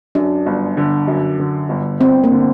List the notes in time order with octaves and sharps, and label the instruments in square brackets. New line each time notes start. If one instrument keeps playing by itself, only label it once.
[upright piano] F#2 [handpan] D4
[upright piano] G1
D3
F#2
D3
G1
[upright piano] G1 [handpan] C4
[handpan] A#3
[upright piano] D3